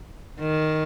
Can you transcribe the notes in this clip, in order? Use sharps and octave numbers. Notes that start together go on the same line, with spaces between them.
D#3